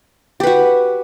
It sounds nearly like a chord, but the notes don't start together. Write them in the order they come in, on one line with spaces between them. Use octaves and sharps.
G4 B4 F#4